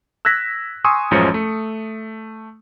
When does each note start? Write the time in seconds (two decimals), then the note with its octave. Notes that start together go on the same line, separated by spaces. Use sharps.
0.25 E6 F#6 G#6 A#6 B6
0.84 G#5 C6 C#6 D#6 E6
1.11 A1 F#2 F3 G#3 C#4 C#7
1.34 A3